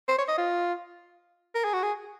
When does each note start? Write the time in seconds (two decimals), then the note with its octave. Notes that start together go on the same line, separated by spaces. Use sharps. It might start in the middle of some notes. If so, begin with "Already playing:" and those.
0.08 C5
0.18 C#5
0.28 D#5
0.38 F4
1.55 A#4
1.64 G#4
1.73 F#4
1.83 G#4